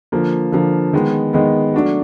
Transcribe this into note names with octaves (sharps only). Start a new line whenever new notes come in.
D3 F3 A#3
D3 F3 A#3
D#3 G#3 B3
D#3 G#3 B3
F#3 A3 D4 F#4